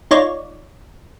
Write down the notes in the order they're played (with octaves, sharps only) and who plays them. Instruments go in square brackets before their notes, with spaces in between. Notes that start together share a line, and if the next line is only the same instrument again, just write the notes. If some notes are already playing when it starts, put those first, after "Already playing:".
[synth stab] D#4 F4 C#5 D5